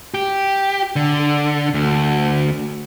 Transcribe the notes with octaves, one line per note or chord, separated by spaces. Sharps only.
G4
D3
D2